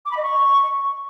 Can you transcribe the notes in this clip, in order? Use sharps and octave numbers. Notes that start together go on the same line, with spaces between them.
D6
B5
D#5
C#6